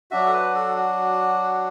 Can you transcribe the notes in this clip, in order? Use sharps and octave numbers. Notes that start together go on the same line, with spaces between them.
F#3 D4 F#4 E5
A4
B4
A4
F#4